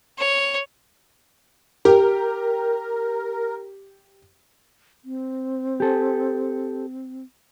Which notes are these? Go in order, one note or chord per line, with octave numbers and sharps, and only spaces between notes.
C#5
G4 A#4
C4
G4 A4